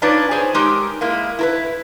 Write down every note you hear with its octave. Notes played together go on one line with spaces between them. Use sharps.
D4 D#4 F4 B4 C#5 D5
G#4 C5 C#5
G#3 D#4 G4 A#4
G#3 A#3 E4
E4 A#4 B4